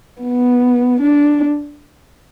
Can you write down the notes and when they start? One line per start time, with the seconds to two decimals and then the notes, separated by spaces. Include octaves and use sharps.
0.21 B3
1.01 D4